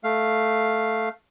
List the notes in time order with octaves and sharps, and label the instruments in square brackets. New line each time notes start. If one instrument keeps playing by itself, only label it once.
[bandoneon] A3 F5